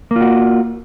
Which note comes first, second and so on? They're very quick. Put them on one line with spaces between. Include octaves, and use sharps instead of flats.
A#3 F4 F#4